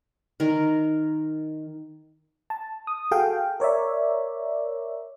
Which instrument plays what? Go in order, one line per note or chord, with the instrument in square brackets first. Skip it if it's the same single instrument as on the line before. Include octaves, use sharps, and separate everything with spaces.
[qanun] D#3 A#4
[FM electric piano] A5
D#6
F#4 G#4 A4 F5 G5
A#4 C#5 D5 E5